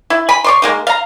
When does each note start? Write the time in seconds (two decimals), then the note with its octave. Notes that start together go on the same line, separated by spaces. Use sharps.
0.10 E4
0.29 G#5 B5
0.44 C#5 D5 C6
0.62 G#3 A#3 D#4
0.87 F5 A#5